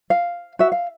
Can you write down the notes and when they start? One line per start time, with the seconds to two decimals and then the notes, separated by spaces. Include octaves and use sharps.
0.10 F5
0.59 F#4 E5
0.72 F5